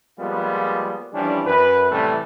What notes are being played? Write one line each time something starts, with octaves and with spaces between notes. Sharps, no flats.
F3 G3 G#3 A#3 B3 F4
E3 F3 G3 C#4 D4
F#2 B4
A2 C3 E3 G3 A3